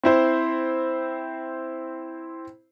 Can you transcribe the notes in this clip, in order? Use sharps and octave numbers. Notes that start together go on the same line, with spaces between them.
C4 E4 C5